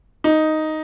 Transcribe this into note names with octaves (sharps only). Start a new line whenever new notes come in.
D#4